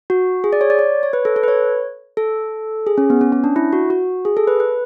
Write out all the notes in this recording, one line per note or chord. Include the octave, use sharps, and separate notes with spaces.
F#4
G#4
D5
C#5
D5
C#5
C#5
B4
A4
A4
B4
C#5
A4
G#4
C#4
B3
C#4
C#4
D4
E4
F#4
F#4
G#4
A4
B4
B4